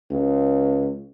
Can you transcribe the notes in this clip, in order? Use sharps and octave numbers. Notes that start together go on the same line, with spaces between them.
C#2